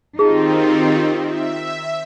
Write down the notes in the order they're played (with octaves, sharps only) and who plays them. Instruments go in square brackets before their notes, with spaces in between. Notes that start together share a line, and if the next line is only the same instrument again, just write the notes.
[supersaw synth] D#3 C4 [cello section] D#4 F4 G4 [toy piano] G#4 A5
[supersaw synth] E5